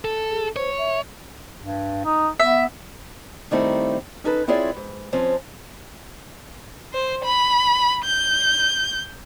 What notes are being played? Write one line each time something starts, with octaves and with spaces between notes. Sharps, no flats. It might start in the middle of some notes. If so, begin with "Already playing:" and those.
A4
G#4
C5 C#5
E5
G2
D#4
B3 E5
D#3 G3 A3 C4 D#4 E4
C#4 D#4 A4 B4
C4 E4 F4 G#4 C#5 D5
G#2
F2 F3 C4 C#4
C5
B5
G6